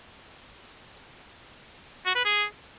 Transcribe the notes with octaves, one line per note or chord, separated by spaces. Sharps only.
F#4
B4
G#4